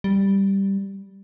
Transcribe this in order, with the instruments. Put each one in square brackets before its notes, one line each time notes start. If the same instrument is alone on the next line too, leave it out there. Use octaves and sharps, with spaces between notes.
[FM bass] G3